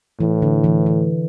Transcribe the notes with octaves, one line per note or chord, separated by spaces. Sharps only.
A2 E3
D3
E3
E3